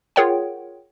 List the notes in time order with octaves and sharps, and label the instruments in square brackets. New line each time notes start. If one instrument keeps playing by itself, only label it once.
[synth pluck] F4 G#4 A#4 C#5 F#5 G5